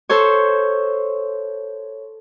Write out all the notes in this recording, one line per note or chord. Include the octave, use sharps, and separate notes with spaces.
A4 C5 C#5